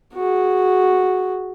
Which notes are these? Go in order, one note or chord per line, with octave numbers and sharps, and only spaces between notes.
F#4 G#4